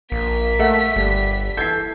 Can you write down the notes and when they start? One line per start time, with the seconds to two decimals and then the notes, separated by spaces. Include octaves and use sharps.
0.12 A#1 A#3 B6
0.59 A3 A4 E5 F#5
0.96 G1 G3
1.57 E3 A4 G6 G#6 C7